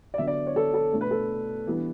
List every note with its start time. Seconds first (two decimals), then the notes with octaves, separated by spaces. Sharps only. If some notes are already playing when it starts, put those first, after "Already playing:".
0.14 D5
0.18 D3 F#3 B3 D4 E5
0.27 D5
0.47 C#5
0.56 A4
0.74 A4
0.92 B2 A3 D4
1.01 B4
1.11 A4
1.67 E3 G3 B3 D4